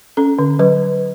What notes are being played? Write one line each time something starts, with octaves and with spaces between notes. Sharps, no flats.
C#4 A4
D3
F#3 B4